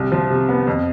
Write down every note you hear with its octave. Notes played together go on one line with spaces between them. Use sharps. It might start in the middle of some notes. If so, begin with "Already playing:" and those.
Already playing: C2
F3
C3
B3
F2